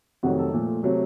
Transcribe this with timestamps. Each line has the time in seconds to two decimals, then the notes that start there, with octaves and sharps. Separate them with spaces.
0.23 F2 C3 D#3 F#3 A3 F#4
0.39 A4
0.53 A#2 F3 A3
0.83 C3 F#3 A3